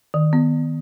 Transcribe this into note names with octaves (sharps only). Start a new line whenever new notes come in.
D#3
B3